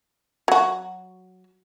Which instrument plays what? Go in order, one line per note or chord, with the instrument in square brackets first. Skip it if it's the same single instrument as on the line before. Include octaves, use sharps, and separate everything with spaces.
[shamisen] F#3 F#4